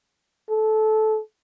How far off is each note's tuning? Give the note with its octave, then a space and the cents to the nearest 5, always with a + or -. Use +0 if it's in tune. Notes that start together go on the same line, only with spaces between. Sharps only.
A4 -15